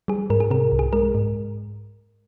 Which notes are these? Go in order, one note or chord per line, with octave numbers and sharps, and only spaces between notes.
G3 G#4
G#2 A#4
G#4
C3 A#4
C2
G#4
G#3 A#4
G#2